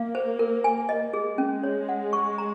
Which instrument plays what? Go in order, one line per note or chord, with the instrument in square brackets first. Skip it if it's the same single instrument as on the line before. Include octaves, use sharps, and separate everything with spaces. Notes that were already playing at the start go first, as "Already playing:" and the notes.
Already playing: [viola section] A#3 [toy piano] F5
[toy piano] C5
A#4
G#5
D#5
[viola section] G#3 [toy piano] G#4
[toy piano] C#4
C#5
F#5
C#6
A#5